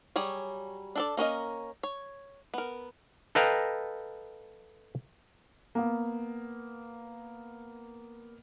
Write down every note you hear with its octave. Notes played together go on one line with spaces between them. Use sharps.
F#3 G3 G#4 C#5
D4 A4 D5
A#3 C#4 A#4 D#5
C#5
B3 A#4
A4 B4 D#5 F5 G5 A#5
A#3 B3